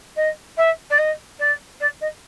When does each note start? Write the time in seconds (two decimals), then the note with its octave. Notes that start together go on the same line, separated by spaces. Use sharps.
0.16 D#5
0.57 E5
0.90 D5
0.98 D#5
1.39 D5
1.80 D5
2.01 D#5